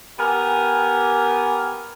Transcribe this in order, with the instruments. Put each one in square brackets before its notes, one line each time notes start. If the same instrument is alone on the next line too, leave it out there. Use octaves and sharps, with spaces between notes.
[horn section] B3 G4 A#4 G#5